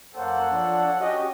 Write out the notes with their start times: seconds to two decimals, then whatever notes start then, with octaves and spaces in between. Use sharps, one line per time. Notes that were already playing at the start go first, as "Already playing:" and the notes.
0.15 F#2 A#3 A4 C5 C#5 F#5
0.50 F3 D4
1.00 C#4 F#4 G4 D#5